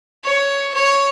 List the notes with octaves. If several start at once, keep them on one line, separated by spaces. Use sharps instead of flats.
C#5
C#5